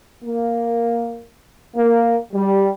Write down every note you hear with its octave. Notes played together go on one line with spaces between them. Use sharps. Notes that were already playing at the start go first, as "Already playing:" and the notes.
A#3
A#3
G3